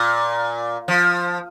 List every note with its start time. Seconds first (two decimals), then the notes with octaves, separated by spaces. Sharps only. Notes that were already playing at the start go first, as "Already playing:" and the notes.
Already playing: A#2
0.88 F3